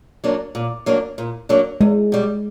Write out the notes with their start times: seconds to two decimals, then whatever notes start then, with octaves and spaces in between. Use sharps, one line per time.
0.24 F#3 A#3 D4
0.55 A#2
0.86 F#3 A#3 D4
1.18 A#2
1.49 F#3 A#3 D4
1.81 E2 G#3
2.12 B2 G3